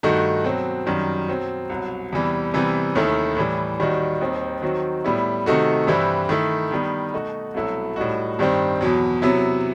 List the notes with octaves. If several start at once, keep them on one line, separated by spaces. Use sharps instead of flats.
G2 D#3 A3 D#4 F#4
B2 F#3 C4
F#2 D#3 G3
B2 F#3 C4
C2 B2 F#3
E2 C3 E3 G3
C3 E3 G3 B3
D#2 D#3 A3 E4
A2 E3 G3
D#2 D#3 G3 D#4 F#4
D#2 D#3 G3 C4 D#4
D#3 F#3 C4 D#4 F#4
A2 G3 B3 E4
C3 D#3 A3 D#4 F#4
G2 E3 G3 C4 E4
D#3 A3 E4
D#3 G3 B3
B2 A3 D#4 F#4
C2 B2 F#3 A3 E4
A2 G3 D#4 F#4
G2 D#3 G3 C4
E2 B2 F#3
C3 F#3 B3 E4